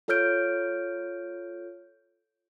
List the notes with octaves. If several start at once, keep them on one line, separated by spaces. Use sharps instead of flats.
F4 A4 C#5 F6 G6 D7